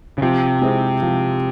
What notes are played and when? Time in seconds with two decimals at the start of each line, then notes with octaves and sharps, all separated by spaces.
0.18 C#3
0.22 C3 F3
0.62 G#3 C4 E4
1.02 F3